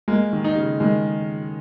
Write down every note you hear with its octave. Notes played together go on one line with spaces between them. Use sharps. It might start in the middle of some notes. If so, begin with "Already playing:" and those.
G#3 A#3
D#3
D#4
C#3
D#3 G#3